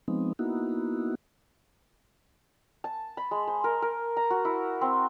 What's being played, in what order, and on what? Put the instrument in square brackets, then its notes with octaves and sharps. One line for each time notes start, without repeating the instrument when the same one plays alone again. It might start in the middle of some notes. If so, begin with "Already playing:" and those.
[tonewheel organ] F3 G#3 B3 C4 D#4
A#3 B3 D#4 E4 F#4
[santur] A5
B5
G#3
C5
A#4
A#4
A#5
F#4
E4
C4